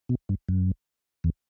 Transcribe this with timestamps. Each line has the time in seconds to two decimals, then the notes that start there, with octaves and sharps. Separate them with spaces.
0.09 B2
0.29 G2
0.49 F#2
1.24 E2